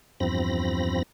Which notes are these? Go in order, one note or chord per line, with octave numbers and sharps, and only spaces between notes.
E2 G2 F3 C4 B5 A#6